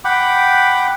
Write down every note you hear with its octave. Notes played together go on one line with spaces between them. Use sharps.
F#5 G5 B5 D6